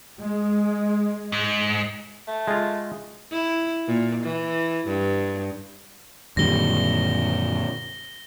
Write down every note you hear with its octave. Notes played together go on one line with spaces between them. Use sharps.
G#3
G#2
A3
G#3 F4
E4
A#2
E3
G2
F#2 A#2 D3 D#3 G3 A#6 G7